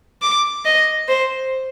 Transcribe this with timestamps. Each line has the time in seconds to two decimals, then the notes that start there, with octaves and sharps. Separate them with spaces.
0.22 D6
0.65 D#5
1.08 C5